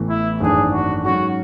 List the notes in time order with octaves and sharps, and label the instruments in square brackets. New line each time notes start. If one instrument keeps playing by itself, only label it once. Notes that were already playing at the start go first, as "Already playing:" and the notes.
Already playing: [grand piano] A1 A2 E3 B3
[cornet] E4
[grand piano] G#1 F#2 E3 A3 D4 [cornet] G#4
[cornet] F#4
[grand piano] G#2 F#3 C#4 [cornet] F#4